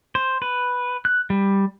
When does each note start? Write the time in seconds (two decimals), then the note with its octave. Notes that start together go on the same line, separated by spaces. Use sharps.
0.15 C5
0.42 B4
1.05 F#6
1.30 G3